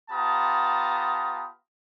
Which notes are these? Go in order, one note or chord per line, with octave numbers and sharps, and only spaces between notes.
B3 F4 G4 A5 A#5 D#6